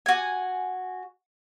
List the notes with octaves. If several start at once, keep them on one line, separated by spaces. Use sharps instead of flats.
F#4 G#5